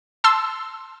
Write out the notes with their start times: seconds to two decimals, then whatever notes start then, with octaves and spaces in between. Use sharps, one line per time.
0.24 A5 C6 E6